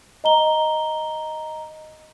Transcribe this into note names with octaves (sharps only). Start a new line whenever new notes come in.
D#5 A#5 G7